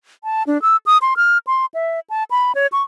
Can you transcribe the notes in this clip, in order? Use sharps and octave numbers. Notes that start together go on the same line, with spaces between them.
A5
D4
E6
D#6
C6
F6
C6
E5
A5
B5
C#5
C#6